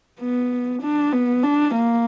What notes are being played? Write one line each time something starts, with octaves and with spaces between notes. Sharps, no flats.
B3
D4
B3
D4
A#3